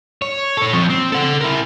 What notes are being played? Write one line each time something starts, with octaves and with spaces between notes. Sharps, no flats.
C#5
A4 C#5
F3 C4
C4
A4 F#5
E4 A#4